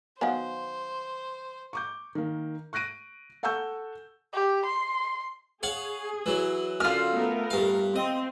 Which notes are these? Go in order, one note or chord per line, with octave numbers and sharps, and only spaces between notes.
D#3 F#3 B3 C5 F5 G#5
C#6 D6 G6
D#3 A#3
C#6 F#6 A#6 D7 D#7
A4 F#5 G#5 C#6 E6 G6
G4
C6
G#4 C#5 F5 F#5
E3 F#3
F#2 D3 F4 F6
A3 B3 A#4
G2 F5
C4 D#5